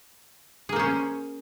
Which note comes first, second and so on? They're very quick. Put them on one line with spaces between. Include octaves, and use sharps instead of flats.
G#4 A#3 C5 C#4